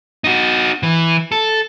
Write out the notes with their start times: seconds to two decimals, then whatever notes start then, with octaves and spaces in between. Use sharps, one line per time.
0.24 D#4 F#4
0.83 E3
1.32 A4